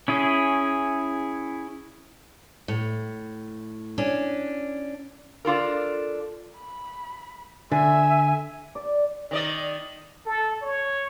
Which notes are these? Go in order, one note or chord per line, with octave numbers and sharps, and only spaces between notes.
C#4 E4 G#4
A2
C#4 D4
D4 F4 A4 A#4
B5
D3 E5 G#5
D5
D#3 D5 D#5
A4
C#5